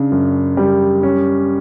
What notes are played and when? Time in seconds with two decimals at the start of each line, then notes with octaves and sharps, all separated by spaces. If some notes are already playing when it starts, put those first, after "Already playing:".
Already playing: C#3 D4
0.12 F#2
0.57 G3
1.03 C#4